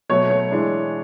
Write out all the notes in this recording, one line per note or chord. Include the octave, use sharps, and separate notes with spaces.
B2 F#3 A3 C#5
C#5
E3 G#3 D4